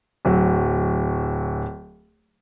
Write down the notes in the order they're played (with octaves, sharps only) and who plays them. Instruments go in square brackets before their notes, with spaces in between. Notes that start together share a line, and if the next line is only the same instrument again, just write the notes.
[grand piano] D1 F#3